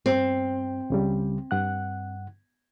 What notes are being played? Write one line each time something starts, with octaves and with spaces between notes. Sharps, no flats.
G2 C4
C#2 C#3 G3
G2 F#5 F#6